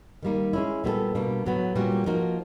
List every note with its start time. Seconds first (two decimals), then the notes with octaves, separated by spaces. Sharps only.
0.23 D#3 G3 A#3 D#4
0.53 G#3 C#4 E4
0.84 A#2 G3 B3 E4 A4
1.15 B2 G3 A#3 D4
1.46 A2 F#3 B3
1.75 A#2 G3 A#3 C#4 F#4
2.06 F3 A#3 D#4 F#4 A#4